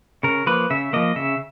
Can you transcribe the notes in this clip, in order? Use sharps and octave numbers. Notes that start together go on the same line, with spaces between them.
C#3 A#4
F3 A#3 B4
C#3 E5
F3 A#3 D#5
C#3 E5